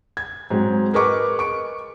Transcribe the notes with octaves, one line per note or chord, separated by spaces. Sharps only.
G#6
G#2 F#3 C4
G#4 A#4 B4 D#5 C#6 D6
C#6 D7